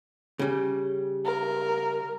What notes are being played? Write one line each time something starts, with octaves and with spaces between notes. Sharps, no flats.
C#3 G3
A#4